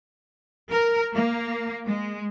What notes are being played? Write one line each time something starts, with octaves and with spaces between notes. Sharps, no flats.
A#4
A#3
G#3